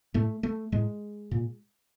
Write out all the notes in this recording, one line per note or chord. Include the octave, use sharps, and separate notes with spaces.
A2 A3
A3
A2 G#3
A#2